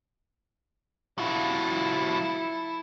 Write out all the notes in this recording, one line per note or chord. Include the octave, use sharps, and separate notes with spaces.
F#3 E4 F4 A4